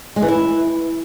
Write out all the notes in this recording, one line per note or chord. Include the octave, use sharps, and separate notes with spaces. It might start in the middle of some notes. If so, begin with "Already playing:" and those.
G#3
E3
E4